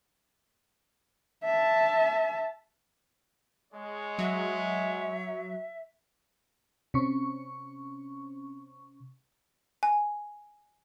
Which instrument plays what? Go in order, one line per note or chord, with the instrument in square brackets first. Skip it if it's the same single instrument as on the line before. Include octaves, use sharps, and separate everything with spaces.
[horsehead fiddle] E5 A5
[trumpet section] G#3 [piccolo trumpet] C#5
[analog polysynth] F#3 [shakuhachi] E5
[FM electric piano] C3 C#4 C#6
[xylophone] G#5